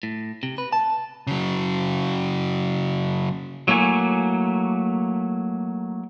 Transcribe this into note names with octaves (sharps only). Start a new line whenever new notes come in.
A2
C3
B4
A5
C#3 F#3
F#3 A3 A#3 E4 G#5